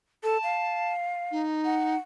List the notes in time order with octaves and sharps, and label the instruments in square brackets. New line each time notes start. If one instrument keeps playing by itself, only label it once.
[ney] A4 [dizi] A5
[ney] F5
[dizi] D#4
[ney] F#5